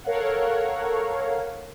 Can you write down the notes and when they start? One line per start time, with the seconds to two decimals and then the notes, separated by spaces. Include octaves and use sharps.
0.04 A4 A#4 C#5 F5 F#5